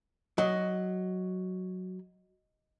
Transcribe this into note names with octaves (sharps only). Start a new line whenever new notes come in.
F#3 D#5